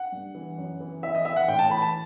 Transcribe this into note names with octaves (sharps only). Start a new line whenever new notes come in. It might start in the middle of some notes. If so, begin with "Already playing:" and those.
Already playing: F#5
G2
E3
F#2
E3
E3 E5
D#5
E3 E5
F#5
A2 G5
A5
E3 B5
A5